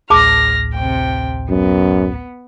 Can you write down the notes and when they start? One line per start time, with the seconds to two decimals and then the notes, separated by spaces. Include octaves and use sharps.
0.10 A1 D2 A2 G#4 A5 D6 F6 A#6
0.73 C3 G5
1.49 F#2 B3